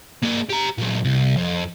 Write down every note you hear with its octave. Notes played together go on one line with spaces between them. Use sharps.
A#3 G#4
G4 A#5
A#2 F#3
C2
F2